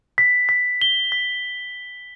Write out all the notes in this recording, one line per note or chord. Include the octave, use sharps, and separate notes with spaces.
B6
B6
G7
B6